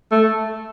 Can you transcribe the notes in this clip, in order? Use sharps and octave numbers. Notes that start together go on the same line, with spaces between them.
A3